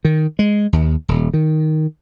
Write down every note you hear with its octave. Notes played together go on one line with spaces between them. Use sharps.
D#3
G#3
D#2
D#1
D#3